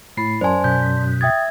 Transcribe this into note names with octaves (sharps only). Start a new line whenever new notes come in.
A2 E4 B5 A6 C7
F#2 C5 D5 G#5 A5 C6
B2 G6
E5 G5 D#6 G#6 A6